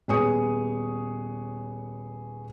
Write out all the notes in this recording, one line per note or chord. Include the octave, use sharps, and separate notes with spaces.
D#1 B3 G#4 C#5 D#6 C#7